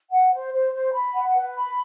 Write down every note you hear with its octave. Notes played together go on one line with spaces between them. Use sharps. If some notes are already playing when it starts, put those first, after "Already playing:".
F#5
C5
C5
C5
B5
F#5
B4
B5